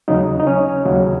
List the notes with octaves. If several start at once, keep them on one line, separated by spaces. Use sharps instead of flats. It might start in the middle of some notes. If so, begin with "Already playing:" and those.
D#2 C#3 F#3 D#4
D#4
C#4
D#2 C#3 F#3